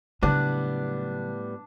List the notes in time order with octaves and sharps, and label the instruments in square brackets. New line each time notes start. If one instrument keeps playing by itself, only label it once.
[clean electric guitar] A2 G3 B3 [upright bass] C#3 F#3 [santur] D4